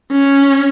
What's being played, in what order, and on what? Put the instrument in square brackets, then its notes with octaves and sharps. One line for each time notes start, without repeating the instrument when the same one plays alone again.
[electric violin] C#4